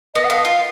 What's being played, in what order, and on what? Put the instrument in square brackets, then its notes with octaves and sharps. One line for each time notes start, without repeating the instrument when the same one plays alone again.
[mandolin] B3 [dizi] D#5
[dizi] F#5
[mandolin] B3 [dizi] F5
[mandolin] F4 [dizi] F5